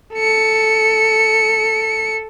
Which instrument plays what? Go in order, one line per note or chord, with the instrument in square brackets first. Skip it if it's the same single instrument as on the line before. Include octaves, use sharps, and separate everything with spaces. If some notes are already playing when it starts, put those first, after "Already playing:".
[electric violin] A4 C#7